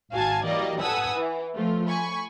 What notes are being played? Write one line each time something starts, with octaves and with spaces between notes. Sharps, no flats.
G#1 F#4 F5 G#5 A5 G#6
E3 F#3 G3 A#3 D5 D#5
A4 B4 F#5 G#5 D#6 E6
E3
F3 A3 F4
G#5 B5 C#6